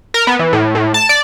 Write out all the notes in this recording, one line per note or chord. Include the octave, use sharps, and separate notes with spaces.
A#4
B3
E3
A2
A2
A5
D5